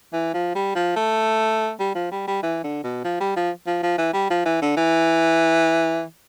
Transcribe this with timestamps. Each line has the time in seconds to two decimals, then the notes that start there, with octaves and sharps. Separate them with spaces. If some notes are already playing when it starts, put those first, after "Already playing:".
0.13 E3
0.34 F3
0.55 G3
0.75 F3
0.96 A3
1.80 G3
1.95 F3
2.11 G3
2.27 G3
2.43 E3
2.64 D3
2.83 B2
3.04 F3
3.20 G3
3.36 F3
3.67 F3
3.83 F3
3.98 E3
4.14 G3
4.30 F3
4.45 E3
4.62 D3
4.77 E3